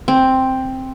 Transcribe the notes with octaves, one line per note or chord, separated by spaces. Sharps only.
C4